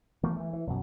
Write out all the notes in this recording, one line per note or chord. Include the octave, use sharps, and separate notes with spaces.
E3 A3 A#3
E3 A3
E3
B1 F#2